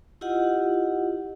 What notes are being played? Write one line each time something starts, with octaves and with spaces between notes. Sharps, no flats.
E4 F4 G4 D#5 F#5